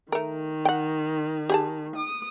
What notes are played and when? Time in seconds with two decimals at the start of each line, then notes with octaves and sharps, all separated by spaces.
0.12 D#3 A3 A#4
0.65 F#5 G5
1.50 G4 G#4 A5
1.97 D#6